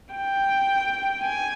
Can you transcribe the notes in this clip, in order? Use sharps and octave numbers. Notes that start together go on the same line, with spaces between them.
G5
G#5